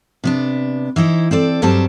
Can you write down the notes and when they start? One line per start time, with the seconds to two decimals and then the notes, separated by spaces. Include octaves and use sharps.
0.24 C3 B3 D4
0.96 E3 D#4 E4 C5
1.31 C4 A4 D5
1.62 G2 F#3 G3 C4 A5